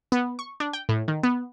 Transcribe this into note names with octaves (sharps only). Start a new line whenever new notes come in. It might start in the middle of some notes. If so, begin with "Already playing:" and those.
B3
C#6
D4
G5
A2
D#3
B3